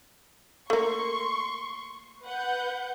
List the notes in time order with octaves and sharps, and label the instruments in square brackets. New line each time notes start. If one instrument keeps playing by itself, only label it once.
[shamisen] A3 A#3 [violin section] C6 C#6
[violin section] B4 F#5 G6